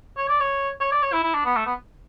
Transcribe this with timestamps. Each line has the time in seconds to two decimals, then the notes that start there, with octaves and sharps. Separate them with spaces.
0.17 C#5
0.29 D5
0.40 C#5
0.81 C#5
0.92 D5
1.02 C#5
1.13 E4
1.23 E4
1.34 D4
1.45 B3
1.56 A3
1.66 B3